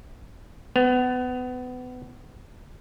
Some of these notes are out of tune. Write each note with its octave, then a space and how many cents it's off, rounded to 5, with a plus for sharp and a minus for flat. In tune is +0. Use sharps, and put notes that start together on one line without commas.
B3 +25